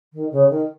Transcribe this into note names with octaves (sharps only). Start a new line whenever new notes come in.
D#3
C#3
D#3